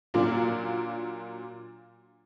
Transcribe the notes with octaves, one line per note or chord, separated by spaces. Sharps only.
A#2 F#3 A#3 D4 F4